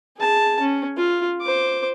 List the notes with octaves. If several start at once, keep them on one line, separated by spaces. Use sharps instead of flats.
G#4 A5
C#4
F4
C5 D6